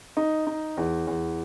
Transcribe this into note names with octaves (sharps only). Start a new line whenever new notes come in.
D#4
D#4
E2
E2